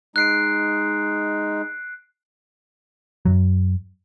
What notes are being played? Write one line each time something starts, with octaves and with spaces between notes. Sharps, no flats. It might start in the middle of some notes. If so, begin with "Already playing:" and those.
G#3 D#4 F#6 C7 D7
F#2 F#3